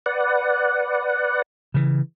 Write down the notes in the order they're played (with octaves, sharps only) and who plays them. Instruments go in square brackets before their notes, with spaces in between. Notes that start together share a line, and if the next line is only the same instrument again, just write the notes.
[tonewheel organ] B4 D5 F#5
[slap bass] C#3 E3